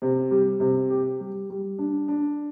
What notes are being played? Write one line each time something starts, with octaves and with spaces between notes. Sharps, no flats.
C3
G3
C3
G4
G3
G3
D4
D4